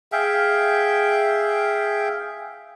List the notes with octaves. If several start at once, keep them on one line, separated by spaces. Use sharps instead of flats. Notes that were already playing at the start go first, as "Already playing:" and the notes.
G#4 E5 F5 G5